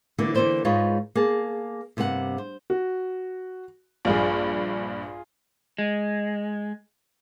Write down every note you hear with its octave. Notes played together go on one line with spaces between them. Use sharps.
D3 E3 F#3 A3 A#3
D3 E3 A#3 B4 C5 D5
G#2 G#3 D#4 F4 B4 C#5
A#3 G#4 A5
G2 C3 A#3 G#4 F#5
C5
F#4
A#1 G2 F4 G#4
G#3